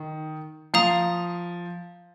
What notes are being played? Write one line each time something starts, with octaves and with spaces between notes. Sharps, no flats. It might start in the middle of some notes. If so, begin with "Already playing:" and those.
Already playing: D#3
F3 F5 A#5 D#6